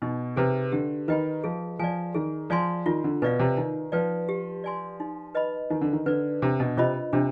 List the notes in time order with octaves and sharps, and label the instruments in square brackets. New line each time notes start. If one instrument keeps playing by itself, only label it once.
[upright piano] B2 [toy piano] D#4
[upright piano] C3 [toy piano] G#4 B4
[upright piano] D3 [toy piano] G4
[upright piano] D#3 [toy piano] B4 D#5 G5 B5
[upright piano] F3 [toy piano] G#4
[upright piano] F3 [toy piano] D5 G#5
[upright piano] D#3 [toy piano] G#4
[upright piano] F3 [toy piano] D5 G#5 C6
[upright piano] D#3 [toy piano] F4
[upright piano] D3
[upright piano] B2 [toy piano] B4 D5 F5
[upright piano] C3
[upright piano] D#3 [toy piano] D#4
[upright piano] F3 [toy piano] B4 D5 G5
[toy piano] G4
D5 G#5 C6
D#4
B4 D#5 B5
[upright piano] D#3 [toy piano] D#4
[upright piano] D3
D#3
[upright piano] D3 [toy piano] B4 D5
[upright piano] C3 [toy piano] D4
[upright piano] B2
[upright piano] C3 [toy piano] F4 C5 D#5 B5
[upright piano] C3 [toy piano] D4